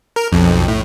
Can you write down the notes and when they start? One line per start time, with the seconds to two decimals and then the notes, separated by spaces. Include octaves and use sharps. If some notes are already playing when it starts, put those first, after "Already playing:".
0.16 A#4
0.32 B1 F2
0.68 A2